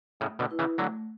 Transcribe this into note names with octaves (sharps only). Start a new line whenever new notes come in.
A2 C#3 A3
B2 D3
E4 B4
C#3 E3
D3 F#3 A3